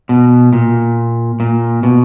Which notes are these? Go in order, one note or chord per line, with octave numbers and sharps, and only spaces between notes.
B2
A#2
A#2
B2